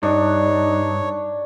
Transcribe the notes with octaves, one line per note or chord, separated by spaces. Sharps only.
G2 D4 D#4 C#5